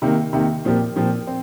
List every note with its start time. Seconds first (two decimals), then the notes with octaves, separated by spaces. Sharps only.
0.02 C3 D#3 A#3
0.33 C3 D#3 A#3
0.65 A#2 F3 C4 G4 A#4
0.96 A#2 F3 C4 G4 A#4
1.27 C4